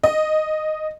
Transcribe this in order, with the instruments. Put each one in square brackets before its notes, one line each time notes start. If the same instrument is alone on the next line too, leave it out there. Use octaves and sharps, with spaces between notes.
[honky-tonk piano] D#5